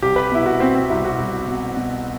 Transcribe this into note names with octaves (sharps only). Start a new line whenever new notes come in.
C2 G4
B4
B2 E4
F#4
B2 C4
C4
C2 E4
F#4
C2
B2
B2